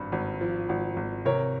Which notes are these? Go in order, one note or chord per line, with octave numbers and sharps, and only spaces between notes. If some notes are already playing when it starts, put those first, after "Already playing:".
Already playing: G#1 G2
G#1
F3
G#1
G#1
C3 A#4 C#5